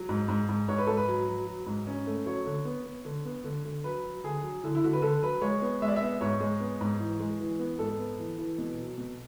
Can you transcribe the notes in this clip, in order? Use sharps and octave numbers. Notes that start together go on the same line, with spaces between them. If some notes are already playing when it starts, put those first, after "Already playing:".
Already playing: F#3
G#2
G#2
G#2
G#2 C#5
B4
G#2 A4
B4
F#3
F#3
F#3
G#2
C#4
A3
F#3 C#5
D3
B3
B3
D3
B3
D3
D3
F#3 B4
F#3
D3 G#4
F#3
D3 E4
E4
D3 F#4
B4
D3 A4
F#3 B4
G#3 C#5
B3
G#3 E5
D5
E5
B3
G#2 C#5
G#3
B3
G#2
E3
G#3
E3
B3
G#2 A4
B3
E3
E3
B2
F#3
B2